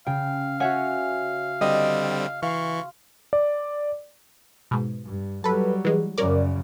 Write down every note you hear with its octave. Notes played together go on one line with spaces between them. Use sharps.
C#3 F5 G5
F#4 C#5 E5 F#5 G#5
D3 G3 C4 D#5
E3 F5 C6 C#6
D5
G#2 B2
G2
F#3 G3 A4 B4
E3 G#3
F#2 C#3 C#4 A#4 D5